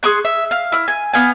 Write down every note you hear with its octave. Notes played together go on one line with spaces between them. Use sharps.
G#4 C6 C#6 F#6
E5
F5
E4 F6
G#5
B3 F5 F#5 G#5